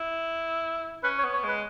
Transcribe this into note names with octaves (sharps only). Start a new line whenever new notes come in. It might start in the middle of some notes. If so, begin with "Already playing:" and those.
Already playing: E4
C#4 B4
C#5
B3
C#5
G#3 B4